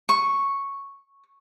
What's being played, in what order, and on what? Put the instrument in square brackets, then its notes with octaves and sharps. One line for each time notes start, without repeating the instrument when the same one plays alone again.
[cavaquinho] C#6